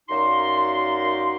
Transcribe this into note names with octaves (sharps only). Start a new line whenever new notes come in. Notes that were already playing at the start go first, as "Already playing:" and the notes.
F#2 A#3 D#4 F#4 D5 C6